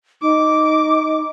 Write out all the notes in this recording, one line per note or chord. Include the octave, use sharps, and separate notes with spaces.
D#4 D6